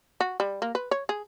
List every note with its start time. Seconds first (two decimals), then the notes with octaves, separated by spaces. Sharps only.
0.21 F#4
0.40 G3
0.62 A#3
0.75 B4
0.91 C#5
1.09 G#4